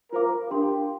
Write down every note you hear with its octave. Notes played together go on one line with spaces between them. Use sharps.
F4 A#4 C5 F5 D6
D4 G4 A#4 F5 C6